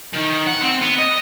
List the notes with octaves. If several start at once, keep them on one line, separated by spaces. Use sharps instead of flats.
D#3
F#5
C4
B3
D#5